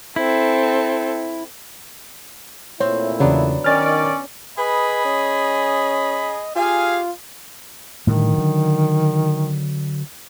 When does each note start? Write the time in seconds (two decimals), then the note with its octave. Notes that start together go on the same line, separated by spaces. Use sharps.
0.16 C4 E4 A4
2.80 A#2 A3 C4 E4 C#5
3.20 E2 C#3 F#3 B3 D4
3.64 D#3 C#4 D5 F6 A6
4.58 G#4 B4 D#5 B5
5.05 C#4
6.56 F4 G4 G#4 F5 G#5
8.07 A2 D3 D#3 G3
8.34 D3 F#3